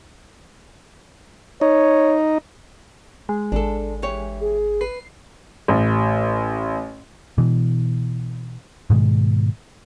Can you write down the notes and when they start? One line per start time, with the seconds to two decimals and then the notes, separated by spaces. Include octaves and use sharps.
1.61 D#4 C#5
3.29 G#3
3.52 G#1 D4 A4
4.02 E3 G4 C#5
4.41 G#4
4.81 B4 C7
5.68 A1
7.38 B2 E3
8.90 G#2 B2 D#3 G#3